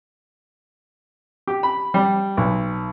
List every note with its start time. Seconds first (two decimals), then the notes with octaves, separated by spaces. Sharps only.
1.47 G4
1.63 B5
1.94 G3
2.37 B1